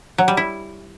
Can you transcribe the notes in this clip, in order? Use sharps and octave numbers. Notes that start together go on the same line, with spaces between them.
F#3
G3
E4